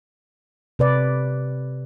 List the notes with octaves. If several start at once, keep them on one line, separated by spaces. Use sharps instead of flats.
C3 B4 D5